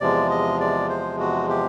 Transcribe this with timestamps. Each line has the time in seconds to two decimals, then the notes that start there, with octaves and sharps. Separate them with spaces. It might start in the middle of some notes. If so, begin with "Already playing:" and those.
0.01 E2 C3 F3 G#3 D5
0.30 D#5
0.60 D5
0.89 C5
1.20 F#4
1.49 G4